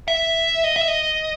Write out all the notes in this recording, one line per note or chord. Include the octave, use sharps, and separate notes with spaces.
E5
D#5
E5
D#5